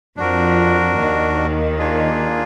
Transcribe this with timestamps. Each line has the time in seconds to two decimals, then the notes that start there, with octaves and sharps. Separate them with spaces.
0.17 F2 F3 D4 F#4 A#4
0.98 D#2 D#3
1.79 A#3 D4 F4 G#4